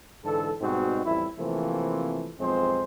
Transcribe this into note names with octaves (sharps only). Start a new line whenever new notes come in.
G#2 D3 E3 A4
G#2 B2 G3 C4 D#4 F#4
A1 F2 G3 E4
C3 E3 F3 A3 A#3 C4
B1 F2 F3 G#3 C4 C5